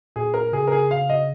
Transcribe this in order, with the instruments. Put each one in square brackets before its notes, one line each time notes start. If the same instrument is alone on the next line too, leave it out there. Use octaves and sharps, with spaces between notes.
[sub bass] A#2 [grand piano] G#4
[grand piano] A#4
[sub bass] C#3 [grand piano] G#4
[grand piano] A#4
G#4
F5
D#5